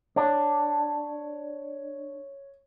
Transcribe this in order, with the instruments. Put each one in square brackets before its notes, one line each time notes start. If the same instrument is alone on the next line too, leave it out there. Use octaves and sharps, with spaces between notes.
[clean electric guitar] D4 [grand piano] C#5